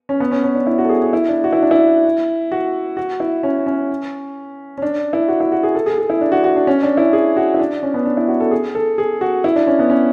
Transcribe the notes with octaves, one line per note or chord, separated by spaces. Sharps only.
C#4
B3
C#4
C#4
D4
E4
F#4
A4
G#4
G#4
E4
D4
F#4
E4
D4
E4
F#4
F#4
E4
C#4
C#4
C#4
D4
E4
F#4
E4
F#4
G#4
A4
G#4
A4
G#4
E4
D4
F#4
F#4
D4
C#4
D4
E4
G#4
F#4
E4
D4
C#4
B3
D4
E4
F#4
A4
G#4
A4
G#4
F#4
E4
D4
C#4
B3
C#4